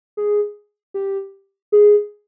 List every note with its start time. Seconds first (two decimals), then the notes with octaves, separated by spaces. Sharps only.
0.17 G#4
0.94 G4
1.72 G#4